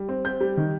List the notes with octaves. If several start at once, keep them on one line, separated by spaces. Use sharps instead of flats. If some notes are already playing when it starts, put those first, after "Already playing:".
Already playing: G3
C4
C4 G6
G3
D#3